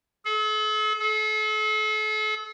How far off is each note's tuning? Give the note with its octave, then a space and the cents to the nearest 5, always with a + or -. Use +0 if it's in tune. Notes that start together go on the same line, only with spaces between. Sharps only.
A4 -45
A4 -40